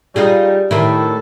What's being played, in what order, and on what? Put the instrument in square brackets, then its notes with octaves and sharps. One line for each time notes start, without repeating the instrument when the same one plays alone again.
[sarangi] G3 [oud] D#4 F4 G#4
[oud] A2 D#3 E4 [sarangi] A4